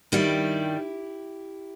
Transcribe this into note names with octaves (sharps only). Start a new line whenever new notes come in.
G2 D#3 G3 E4 G4